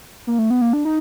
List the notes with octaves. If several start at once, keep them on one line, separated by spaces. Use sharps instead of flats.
A#3
A3
B3
A#3
D4
D#4